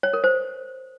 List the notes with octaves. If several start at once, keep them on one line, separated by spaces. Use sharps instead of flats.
C#5
A#4
C5